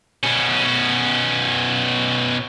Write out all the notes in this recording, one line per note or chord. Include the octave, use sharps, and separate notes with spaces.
B2 C#4